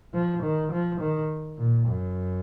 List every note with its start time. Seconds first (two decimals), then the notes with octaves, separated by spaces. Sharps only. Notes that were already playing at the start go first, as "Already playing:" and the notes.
0.14 F3
0.43 D#3
0.72 F3
1.00 D#3
1.58 A#2
1.88 F#2